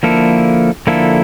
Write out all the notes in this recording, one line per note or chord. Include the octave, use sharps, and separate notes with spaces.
D3 F3 A#3 E4 A4
D3 F3 A#3 E4 A4